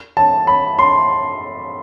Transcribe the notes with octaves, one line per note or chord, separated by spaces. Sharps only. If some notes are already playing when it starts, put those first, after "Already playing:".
A5
B5
C6